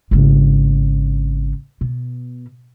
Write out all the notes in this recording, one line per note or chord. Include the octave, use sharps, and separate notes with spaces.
G#1 C#3
B2